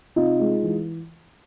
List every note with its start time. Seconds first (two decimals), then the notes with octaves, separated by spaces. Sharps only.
0.16 C3 D#4 F4
0.40 G#3
0.64 E3